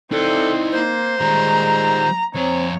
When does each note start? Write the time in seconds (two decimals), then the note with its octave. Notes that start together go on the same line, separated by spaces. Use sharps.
0.12 C4 D#4 E4 A4 D5
0.72 A#3 C5
1.21 D#3 G3 G#3 A#5
2.35 F2 C4 C#5 A#5